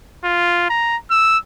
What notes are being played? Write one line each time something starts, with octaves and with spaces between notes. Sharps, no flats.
F4
A#5
E6